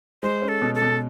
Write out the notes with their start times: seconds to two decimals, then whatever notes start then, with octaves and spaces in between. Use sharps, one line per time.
0.23 G#3 C5
0.42 C#4
0.48 A4
0.62 B2
0.75 A4
0.82 B2